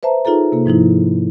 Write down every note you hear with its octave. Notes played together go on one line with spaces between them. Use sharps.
B4 C5 E5 A5 A#5
D#4 F4 G#4 A4 A#5
C3 A#3 A4
G#2 F3 D#4 E4